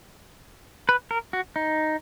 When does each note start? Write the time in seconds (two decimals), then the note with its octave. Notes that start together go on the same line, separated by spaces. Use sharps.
0.89 B4
1.11 A#4
1.33 F#4
1.56 D#4